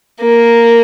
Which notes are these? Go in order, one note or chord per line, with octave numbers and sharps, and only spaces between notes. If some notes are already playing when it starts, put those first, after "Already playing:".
A#3